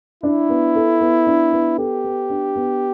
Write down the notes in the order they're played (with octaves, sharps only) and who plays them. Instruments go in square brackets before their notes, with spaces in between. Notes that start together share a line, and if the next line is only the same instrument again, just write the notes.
[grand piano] D4 [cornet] E4
[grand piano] B3
A4
B3
D4
B3
[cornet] G4 [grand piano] A4
[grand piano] B3
D4
B3